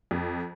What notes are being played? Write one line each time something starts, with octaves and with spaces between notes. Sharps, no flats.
F2